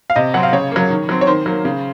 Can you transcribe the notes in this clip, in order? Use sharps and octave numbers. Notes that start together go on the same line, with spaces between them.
F5
C3 D#5
F#3 C4 F#5
F5
C#3 C#5
F#3 A#3
D#3
F#3 C4
C#5
D#3 C5
F#3 A#3
C#3